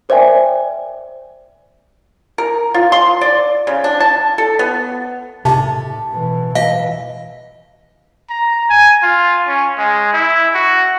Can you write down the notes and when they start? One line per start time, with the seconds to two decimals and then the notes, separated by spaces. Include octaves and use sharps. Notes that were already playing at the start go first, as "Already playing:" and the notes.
0.09 A#4 C5 D5 E5 G5 G#5
2.38 A#4
2.74 F4
2.92 C6
3.21 D5
3.67 C#3
3.84 D4
4.00 A5
4.38 A4
4.59 B3
5.45 A2 C3 A5
6.12 B2 E3
6.55 E3 D#5 F5
8.30 A#5
8.70 G#5
9.03 F4
9.48 C#4
9.78 G#3
10.14 E4
10.55 F#4